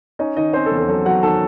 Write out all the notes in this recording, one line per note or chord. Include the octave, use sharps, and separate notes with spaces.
C#4 D#4 D#5
D#3 D#4 D#5
C4 C#4 C5
A4
E2
A4
F#3 A4
F#3 F#4 F#5
D#3 A4 A5